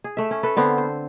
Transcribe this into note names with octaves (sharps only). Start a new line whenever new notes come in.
G#4
A3 E5
C#4
A4 B4
D3 B3 C4
C5